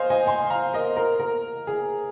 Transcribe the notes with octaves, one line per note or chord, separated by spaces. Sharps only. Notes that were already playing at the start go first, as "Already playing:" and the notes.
Already playing: C5 D#5 F5 G#5
D#5 G#5
G#5 C6
F5 A#5
A#4 D#5
A#4
A#4
G#4